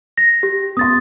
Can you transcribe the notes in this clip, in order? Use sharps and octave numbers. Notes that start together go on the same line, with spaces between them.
A#6
G4
B3 C6 D#6 A6